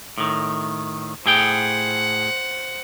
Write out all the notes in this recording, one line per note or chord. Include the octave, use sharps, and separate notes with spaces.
A2 D#3
A2 G#4 C5 F#5 G5